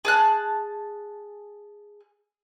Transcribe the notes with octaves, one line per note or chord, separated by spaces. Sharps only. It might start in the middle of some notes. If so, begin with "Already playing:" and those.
G#4 A5 F#6